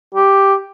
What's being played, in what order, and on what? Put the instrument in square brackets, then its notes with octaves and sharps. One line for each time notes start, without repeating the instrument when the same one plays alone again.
[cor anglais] G4